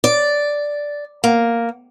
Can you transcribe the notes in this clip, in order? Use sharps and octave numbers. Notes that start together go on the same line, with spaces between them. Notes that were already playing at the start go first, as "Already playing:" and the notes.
D5
A#3